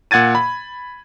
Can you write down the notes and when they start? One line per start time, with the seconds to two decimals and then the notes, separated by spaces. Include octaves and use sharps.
0.11 A#2 F#5 G#6 A6 D#7
0.35 B5